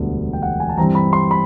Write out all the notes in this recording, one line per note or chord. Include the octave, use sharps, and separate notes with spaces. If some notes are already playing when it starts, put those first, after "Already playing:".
Already playing: E1 D2 D3 G3 B3
G5
F#5
G#5
A5
G2 E3 G3 C4 A#5
B5
C6
B5